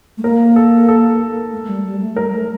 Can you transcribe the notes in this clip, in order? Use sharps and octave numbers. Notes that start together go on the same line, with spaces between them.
A3
A#3 A#4
A4
A4
A3
A3
G3
G3
A3
G3 A#4
A3